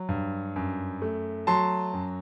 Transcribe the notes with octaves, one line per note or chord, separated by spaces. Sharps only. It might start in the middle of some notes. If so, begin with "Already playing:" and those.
Already playing: F#3
G2
F#2
A3
F#3 A5 C6
F#2